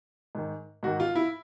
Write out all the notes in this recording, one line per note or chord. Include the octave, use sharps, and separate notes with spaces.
G#2 D#3
G#2 D#3 F#4
F4
E4